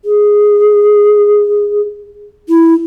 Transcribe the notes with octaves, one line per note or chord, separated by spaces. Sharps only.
G#4
E4